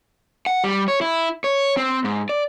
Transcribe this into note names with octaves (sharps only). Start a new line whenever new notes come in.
F#5
G3
C#5
E4
C#5
C4
G#2
D5